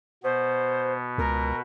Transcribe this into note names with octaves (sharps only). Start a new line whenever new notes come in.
B2 B3 C5
C#2 A#4